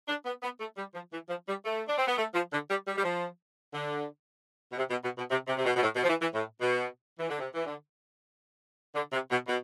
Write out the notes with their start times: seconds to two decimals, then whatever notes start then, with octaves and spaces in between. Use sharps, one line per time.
0.08 D4
0.25 B3
0.43 B3
0.60 A3
0.77 G3
0.95 F3
1.12 E3
1.29 F3
1.48 G3
1.65 A3
1.88 D4
1.98 C4
2.07 B3
2.17 A3
2.34 F3
2.52 D3
2.69 G3
2.87 G3
2.97 G3
3.03 F3
3.73 D3
4.72 B2
4.78 C3
4.91 B2
5.04 B2
5.18 B2
5.31 C3
5.47 C3
5.58 C3
5.65 B2
5.76 B2
5.83 A2
5.96 B2
6.04 F3
6.08 E3
6.21 E3
6.34 A2
6.61 B2
7.19 E3
7.29 D3
7.39 C3
7.54 E3
7.66 D3
8.95 D3
9.13 C3
9.31 B2
9.48 B2